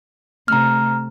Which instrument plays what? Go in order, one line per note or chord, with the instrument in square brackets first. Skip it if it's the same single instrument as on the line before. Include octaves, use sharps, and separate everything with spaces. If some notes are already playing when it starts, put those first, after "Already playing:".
[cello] C3 A3 [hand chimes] A#5 F6